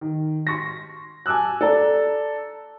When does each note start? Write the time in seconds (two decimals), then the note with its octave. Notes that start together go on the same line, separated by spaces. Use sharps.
0.01 D#3
0.47 C6 C#6 A#6
1.26 G#5 A5 D6 E6 F#6
1.61 A4 D5 A#5